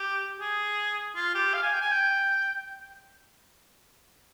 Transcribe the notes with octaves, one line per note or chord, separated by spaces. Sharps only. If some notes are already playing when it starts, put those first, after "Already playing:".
Already playing: G4
G#4
F4
G4
F5
G#5
G5
G#5
G5